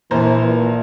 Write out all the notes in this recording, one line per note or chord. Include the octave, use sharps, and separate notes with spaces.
A#1 E3 C5 A#5
A#2